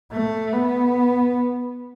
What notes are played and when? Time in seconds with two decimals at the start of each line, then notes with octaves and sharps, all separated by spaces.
0.12 A3
0.53 B3